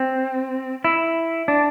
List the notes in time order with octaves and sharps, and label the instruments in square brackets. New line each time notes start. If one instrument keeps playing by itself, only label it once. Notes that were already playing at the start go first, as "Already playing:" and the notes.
Already playing: [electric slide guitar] C4
E4
D4